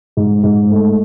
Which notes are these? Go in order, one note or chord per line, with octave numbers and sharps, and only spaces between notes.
G#2
G#2
A3